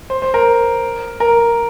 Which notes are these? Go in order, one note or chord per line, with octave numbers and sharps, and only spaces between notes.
C5
C5
A#4
A#4